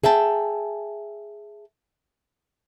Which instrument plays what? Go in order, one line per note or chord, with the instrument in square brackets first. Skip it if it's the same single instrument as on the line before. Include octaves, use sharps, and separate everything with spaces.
[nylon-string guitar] G#4 E5 G5 A5